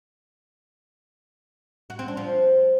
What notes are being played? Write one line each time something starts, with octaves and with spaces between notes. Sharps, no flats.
F#4
C4
D4
F3